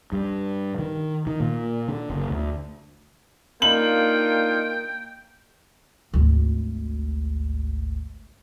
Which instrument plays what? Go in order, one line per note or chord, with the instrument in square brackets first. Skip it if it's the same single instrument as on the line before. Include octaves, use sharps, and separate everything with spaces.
[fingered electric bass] G2
D#3
D#3
A#2
D3
F#1
D2
[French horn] A#3 [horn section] D4 D#4 F4 [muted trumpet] G5 [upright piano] F#7
[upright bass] G#1 D2